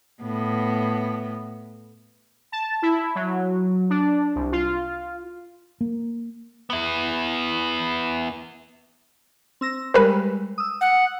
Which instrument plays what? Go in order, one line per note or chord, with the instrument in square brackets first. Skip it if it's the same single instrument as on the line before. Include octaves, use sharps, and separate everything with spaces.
[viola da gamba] A2 B3
[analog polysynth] A5
E4
F#3
D4
C2
F4
[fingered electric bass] A#3
[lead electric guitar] B3 E4
[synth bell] C4 E6 A#6
[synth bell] G3 G#3 [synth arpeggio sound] A#4 B4
[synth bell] D#6 E6
[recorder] F#5